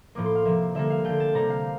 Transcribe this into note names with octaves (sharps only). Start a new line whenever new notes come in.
A2 F3 A#3 D6
C6
F5
C3 F3 A#3 E5
D3 G3 A#3 E5
F5
D3 A3 G5
A5
C3 G3 A#3 A#5
F5